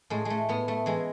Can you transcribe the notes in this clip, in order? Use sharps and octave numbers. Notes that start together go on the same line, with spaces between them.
A2 G#3
G#3 A3
A2 B3
A3
E3 G#3